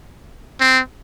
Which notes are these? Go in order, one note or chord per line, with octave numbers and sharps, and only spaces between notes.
C4